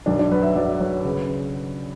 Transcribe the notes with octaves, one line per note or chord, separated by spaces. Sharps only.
B1 D4
D4
F#3 B4
E5
F#3 D5
F#3 C#5
C#3 B4